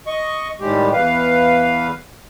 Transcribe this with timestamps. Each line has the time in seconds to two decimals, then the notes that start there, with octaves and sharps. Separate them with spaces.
0.07 D#5 C#6
0.60 A2 D#3 G3 G#3 G4
0.93 E2 B4 F5